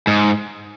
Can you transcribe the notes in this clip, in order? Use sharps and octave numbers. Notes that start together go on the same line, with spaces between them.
G#2